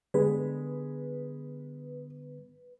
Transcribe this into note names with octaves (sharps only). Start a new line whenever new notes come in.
D3 G3 G#3 B3 B4